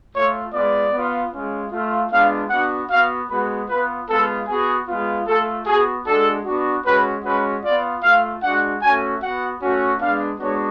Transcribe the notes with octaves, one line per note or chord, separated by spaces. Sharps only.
A3 F4 C#5
G#3 B3 F4 D5
B3 F4
G#3 C#4 F4
A3 F4
G#3 B3 D4 F4 F5
B3 D4 F#4 F#5
B3 F#4 F5
G#3 B3 F#4 B4
B3 F4 B4
G#3 B3 F4 A4
B3 F#4 G#4
G#3 B3 F4
A3 F4 A4
B3 F#4 G#4
G#3 D4 F#4 A4
B3 D4 F#4
G#3 C#4 F#4 B4
G#3 C#4 F#4 B4
B3 F4 D5
A3 F4 F5
G#3 D4 F#4 F#5
A3 C#4 F#4 G#5
B3 F#4 F#5
A3 C#4 F#4
G#3 B3 D4 F5
G#3 B3 D4 F#4 C#5